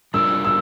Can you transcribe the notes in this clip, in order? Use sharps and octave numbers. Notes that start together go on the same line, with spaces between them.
G3 D4 F4 A#4 D5 E6
E6